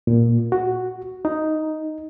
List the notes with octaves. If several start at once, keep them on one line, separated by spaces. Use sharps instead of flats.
A#2
F#4
D#4